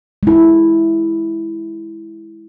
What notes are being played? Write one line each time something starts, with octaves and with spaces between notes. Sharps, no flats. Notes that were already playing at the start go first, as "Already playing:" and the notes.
G#3 E4